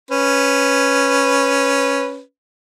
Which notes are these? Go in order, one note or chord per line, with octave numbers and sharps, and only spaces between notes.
C#4 B4